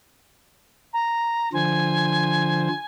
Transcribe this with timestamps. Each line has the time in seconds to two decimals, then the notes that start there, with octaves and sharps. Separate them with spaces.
0.93 A#5
1.53 D3 F3 C5 G#5